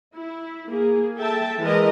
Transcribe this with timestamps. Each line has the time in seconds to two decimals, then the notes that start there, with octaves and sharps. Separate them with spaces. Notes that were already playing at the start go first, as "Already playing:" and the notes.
0.14 E4
0.68 A#3 G#4
1.16 A4 E5 G5 A5
1.60 E3 G#3 A#4 D#5